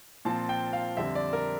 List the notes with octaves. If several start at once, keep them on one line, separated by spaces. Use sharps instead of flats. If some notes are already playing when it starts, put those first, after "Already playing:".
A#2 F3 C4 A5
G5
F5
F2 D3 G3 C4 E5
D5
A#4